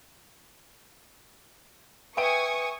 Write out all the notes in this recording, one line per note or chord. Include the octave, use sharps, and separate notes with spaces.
B4 E5 G5 G#5 C#6 D#6 D7